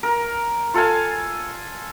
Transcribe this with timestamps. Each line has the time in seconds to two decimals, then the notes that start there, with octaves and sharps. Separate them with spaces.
0.03 A#4
0.74 F4 A4 F5 G#5